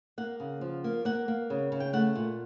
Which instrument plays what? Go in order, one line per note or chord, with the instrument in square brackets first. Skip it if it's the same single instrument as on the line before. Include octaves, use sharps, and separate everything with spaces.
[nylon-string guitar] A#3 F#5
C#3
F3
A#3
A#3 F#5
A#3
C#3
C#3
G5
A3 F#5
A#2